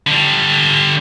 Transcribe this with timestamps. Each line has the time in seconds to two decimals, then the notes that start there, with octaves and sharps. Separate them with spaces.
0.07 D3 G3